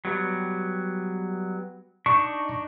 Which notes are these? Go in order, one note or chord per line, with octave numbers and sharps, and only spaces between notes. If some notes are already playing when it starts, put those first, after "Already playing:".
F#3 G3 B3
D4 D#4 C#6